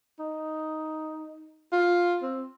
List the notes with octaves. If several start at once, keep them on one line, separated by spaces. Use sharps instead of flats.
D#4
F4
C4